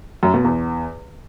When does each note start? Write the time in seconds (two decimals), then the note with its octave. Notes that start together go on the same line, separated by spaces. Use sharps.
0.23 F#2
0.34 B2
0.44 E2